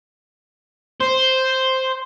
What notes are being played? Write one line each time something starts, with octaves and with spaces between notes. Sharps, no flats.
C5